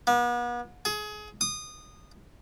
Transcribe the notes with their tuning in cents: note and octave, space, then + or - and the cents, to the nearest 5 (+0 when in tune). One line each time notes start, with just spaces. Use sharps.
B3 -40
G#4 +25
D#6 -20